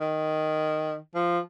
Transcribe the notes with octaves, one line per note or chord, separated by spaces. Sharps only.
D#3
F3